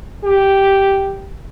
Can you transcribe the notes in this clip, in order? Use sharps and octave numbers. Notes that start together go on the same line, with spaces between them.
G4